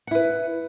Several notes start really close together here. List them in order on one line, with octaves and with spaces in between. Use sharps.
F#5 E4 B4